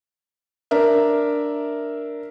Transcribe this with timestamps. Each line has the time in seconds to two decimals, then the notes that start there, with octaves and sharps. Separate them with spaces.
0.71 D4 A#4 E5